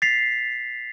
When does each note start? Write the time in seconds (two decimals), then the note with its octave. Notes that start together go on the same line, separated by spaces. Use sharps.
0.02 A6 B6 C7 F7